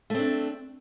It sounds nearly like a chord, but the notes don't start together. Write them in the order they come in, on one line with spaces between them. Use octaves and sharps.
A3 C4 D4